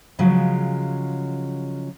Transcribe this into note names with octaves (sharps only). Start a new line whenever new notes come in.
C#3 F3 F#3 G#3